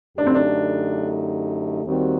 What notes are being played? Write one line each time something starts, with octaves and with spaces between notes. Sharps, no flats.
F#2 D3 A3 D4 D#4 G4
C4
D4
D#2 D#3 G3 C4 F#4